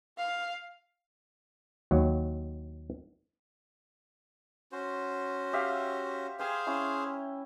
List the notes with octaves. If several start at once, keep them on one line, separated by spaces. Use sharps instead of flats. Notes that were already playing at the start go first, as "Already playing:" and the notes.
F5
D#2 F#3
C#4 F#4 C5
G4 E5 F5
G#4 C5 F5 G5 G#5
C#4 E4